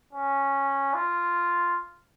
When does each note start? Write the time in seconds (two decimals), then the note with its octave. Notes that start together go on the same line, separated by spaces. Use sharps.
0.13 C#4
0.94 F4